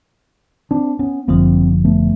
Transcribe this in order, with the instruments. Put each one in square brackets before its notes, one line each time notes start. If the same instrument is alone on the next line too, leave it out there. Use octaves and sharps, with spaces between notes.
[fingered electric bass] C4 D4
B3 C#4
[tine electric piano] G1 F#2 D3 F3 [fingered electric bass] A#3 C4
[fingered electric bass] A3 B3